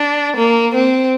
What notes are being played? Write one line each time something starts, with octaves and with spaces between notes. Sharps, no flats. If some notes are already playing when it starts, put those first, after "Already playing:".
Already playing: D4
A#3
C4